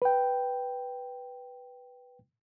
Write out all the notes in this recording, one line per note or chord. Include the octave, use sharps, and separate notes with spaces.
B4 G5